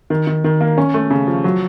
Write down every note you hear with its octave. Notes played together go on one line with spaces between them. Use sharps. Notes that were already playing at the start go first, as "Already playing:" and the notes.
D#3
D#3
D#3
A#3
C#4
A3
C#3
F3
F#3